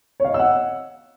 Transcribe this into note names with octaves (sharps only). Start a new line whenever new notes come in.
C#5 D#5 F5 F#5 E6